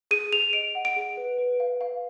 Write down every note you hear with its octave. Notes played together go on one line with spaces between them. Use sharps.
G#4 D#7
G#4 F7
D#5 D7
F#5
D7
G#4
B4
B4
F5
F5